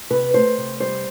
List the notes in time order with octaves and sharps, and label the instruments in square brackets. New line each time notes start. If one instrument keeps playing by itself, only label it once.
[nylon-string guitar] C3 B4
A3 C5
C3
G3 C5